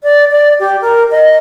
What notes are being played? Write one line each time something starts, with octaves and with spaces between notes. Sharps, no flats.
D5
D5
G4
A#4
D#5